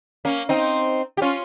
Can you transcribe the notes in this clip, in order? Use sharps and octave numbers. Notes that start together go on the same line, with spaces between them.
A#3 C#4
C4 D#4
G4
C#4 F4